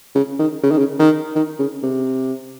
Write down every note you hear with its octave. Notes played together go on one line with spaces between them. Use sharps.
C#3
D#3
C#3
D#3
C#3
D#3
D#3
C#3
C3